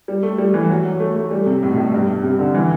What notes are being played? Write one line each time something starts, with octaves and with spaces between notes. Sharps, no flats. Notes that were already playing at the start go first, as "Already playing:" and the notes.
G3
A3
G3
E3
F#3
F#3
A3
A3
G3
C3
A2
B2
A2
G2
C3
D3
E3